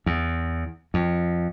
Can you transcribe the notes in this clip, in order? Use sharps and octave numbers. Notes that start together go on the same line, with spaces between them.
E2
F2